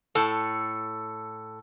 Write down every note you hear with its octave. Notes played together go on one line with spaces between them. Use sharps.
A2 A4 A5